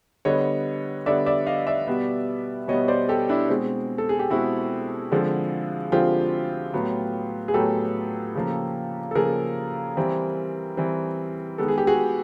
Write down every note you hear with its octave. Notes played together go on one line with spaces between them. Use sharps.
D3 G3 B3 C#5 D#5
D3 G3 B3 D5 E5
D5 E5
D#5 F5
D5 E5
B2 G3 B3
B2 G3 B3 C#5 D#5
C5 D5
G4 A4
D4 E4
B2 G#3 C4
A4
G#4
G4
B2 G#3 C4 E4 F#4
D3 F3 G#3 C4
D3 F3 G#3 C4 F4 G4
A2 F#3 B3
G#4
A2 F#3 B3 G4 A4
C#3 F3 A#3
A4
C#3 F3 A#3 G#4 A#4
E3 G3 C4
E3 G3 C4
D#3 G#3 B3 A4
G#4
G4
F#4 G#4